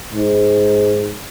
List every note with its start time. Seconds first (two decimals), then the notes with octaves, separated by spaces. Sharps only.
0.13 G#2